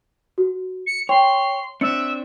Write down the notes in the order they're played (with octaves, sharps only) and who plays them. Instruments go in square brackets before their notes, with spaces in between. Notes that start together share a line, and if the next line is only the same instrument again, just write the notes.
[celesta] F#4
[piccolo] C#7
[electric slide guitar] C#5 [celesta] G5 [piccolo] C6
[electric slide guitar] C4 D4 [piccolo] E5 [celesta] C#7